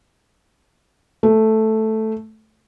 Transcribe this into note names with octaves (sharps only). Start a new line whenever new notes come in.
A3